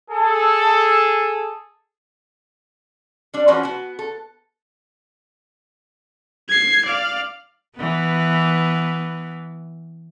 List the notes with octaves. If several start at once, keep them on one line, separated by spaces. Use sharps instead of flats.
G#4 A4
G3 D4
E3 F3 C#4 F#4 B4 C5
B3 F#4
A4
G#6 C7
D5 F5
E3 B3